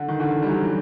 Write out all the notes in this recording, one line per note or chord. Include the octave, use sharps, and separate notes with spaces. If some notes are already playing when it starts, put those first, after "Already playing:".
Already playing: D3
D#3
D3 E3
G3
E3 F#3